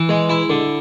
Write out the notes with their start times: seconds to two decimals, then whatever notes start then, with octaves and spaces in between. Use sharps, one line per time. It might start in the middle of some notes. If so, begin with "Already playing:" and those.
Already playing: E3
0.09 G#3
0.29 E4
0.50 D3